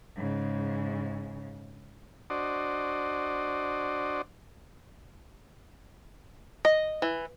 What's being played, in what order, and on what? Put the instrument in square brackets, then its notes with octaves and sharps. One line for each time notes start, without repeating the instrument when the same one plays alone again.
[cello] G#2 C#3
[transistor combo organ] D4 F#4 C5 D5 D#5
[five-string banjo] D#5
E3